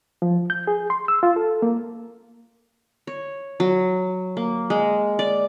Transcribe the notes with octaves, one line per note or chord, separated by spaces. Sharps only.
F3
G6
G#4
C6
E6
F4
A4
A#3
C#5
F#3
A#3
G#3
D5